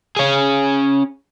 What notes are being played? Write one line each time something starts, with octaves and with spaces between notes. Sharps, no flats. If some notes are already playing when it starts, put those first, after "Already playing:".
C#4 G#4